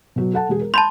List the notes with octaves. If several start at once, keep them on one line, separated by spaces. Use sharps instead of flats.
B2 F#3
A4 F#5 A5
E1 G#4
A#4
A5 B5 C6 G6 A6